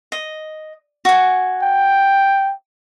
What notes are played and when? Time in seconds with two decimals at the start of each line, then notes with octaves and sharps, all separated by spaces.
0.12 D#5
1.05 F#4 G#5
1.62 G5